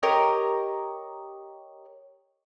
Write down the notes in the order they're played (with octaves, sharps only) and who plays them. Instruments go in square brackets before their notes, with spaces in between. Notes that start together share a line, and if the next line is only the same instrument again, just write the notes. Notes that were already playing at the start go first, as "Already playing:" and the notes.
[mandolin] G4 A#4 C#5 D#5